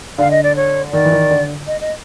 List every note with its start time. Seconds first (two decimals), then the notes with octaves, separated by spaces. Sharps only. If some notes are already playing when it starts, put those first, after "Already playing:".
0.18 D3 F5
0.31 D#5
0.43 D5
0.56 C#5
0.92 D#3 D5
1.05 E3
1.12 D#3
1.31 D3
1.67 D#5
1.81 D#5